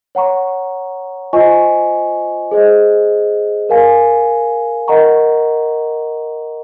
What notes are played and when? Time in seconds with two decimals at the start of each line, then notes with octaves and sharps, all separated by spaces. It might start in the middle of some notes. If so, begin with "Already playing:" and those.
0.15 C#5 F#5 A#5 C#6
1.33 F4 C5 D#5 G#5 C#6
2.51 G#4 C5 D#5
3.69 A#4 F5 G#5
4.88 A#4 D#5 F#5 A#5 C#6